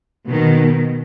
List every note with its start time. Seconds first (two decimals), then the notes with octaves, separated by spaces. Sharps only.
0.28 B2 D#3